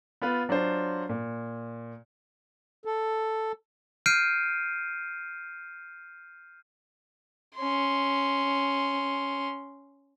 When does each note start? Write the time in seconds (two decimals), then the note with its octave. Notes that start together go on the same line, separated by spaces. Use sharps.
0.22 B3 F4 B4
0.49 F#3 D4 F4 C5
1.09 A#2
2.85 A4
4.06 F6 G6 C7 D7 D#7
7.56 C#4 C6